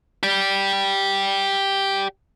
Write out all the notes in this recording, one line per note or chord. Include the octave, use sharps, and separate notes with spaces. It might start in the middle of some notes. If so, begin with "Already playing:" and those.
G4 D5